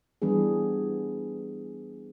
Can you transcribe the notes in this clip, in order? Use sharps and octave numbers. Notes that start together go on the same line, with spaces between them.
E3 G3 B3 D4 G#4